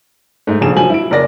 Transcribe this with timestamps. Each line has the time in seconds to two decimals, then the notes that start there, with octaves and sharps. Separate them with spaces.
0.47 G#2 A3
0.61 F1 A#1 G#4 E7
0.76 F3 F#3 G#5 F#7
0.90 E4 D7
1.11 F#1 A#3 D5 A#6